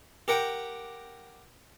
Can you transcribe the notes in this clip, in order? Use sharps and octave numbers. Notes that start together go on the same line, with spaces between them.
G4 A#4 F#5 G5